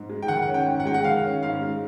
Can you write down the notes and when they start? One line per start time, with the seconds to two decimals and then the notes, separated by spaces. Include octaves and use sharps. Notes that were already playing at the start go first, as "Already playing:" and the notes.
Already playing: G#2
0.10 G#3
0.22 G5
0.28 D#3 F#5
0.42 F#5
0.47 C#4
0.54 G5
0.66 G#2
0.80 F#5
0.85 G#3 G5
0.94 F#5
1.04 D#3 F5
1.23 C#4
1.43 G#2 F5
1.62 G#3